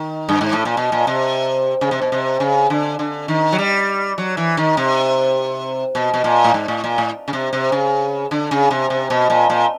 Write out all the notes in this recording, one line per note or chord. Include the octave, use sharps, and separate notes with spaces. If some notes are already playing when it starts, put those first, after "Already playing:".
Already playing: D#3
G2
G#2
A2
A#2
B2
A#2
C3
C#3
C3
B2
C3
C#3
D3
D3
D#3
F#3
G3
F#3
E3
D#3
C3
B2
B2
A#2
A2
G#2
A2
A#2
A2
C#3
C3
C3
C#3
D3
C#3
C3
C3
B2
A#2
A#2